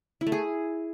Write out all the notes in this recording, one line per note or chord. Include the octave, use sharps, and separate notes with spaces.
E4
A3
G#4